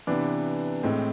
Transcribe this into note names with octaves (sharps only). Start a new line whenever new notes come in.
C3 E3 B3 D4
A2 G#3 C4